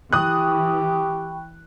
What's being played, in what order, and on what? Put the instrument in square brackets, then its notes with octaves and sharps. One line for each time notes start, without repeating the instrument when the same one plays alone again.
[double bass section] E3 [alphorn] G4 [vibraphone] G5 B5 C#6 [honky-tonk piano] D#6 F#6